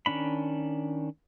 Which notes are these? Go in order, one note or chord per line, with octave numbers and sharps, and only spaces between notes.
D#3 C#4 D4 B5